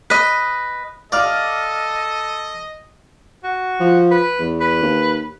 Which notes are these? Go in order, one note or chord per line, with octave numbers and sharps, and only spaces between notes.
B4 D#5
A4 D5 D#5 F5 D6 F6
F#4
F3
B4
E2
B4
D#2